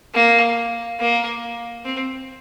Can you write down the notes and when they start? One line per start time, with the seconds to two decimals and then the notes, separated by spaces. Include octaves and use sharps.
0.14 A#3
1.00 A#3
1.85 C4